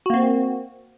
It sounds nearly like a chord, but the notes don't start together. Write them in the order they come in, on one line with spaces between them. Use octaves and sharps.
F#4 A#3 C4